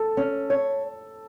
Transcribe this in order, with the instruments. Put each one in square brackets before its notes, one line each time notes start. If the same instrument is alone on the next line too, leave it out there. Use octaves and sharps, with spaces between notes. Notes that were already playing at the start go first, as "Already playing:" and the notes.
Already playing: [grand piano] A4
[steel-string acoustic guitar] C#4
C#5